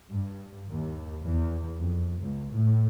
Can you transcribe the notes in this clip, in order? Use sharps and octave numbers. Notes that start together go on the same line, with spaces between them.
G2
D#2
E2
F2
C#2
A2